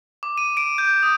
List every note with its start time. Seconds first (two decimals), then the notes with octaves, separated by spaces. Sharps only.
0.23 D6
0.38 D#7
0.57 D7
0.78 G6
1.03 D#6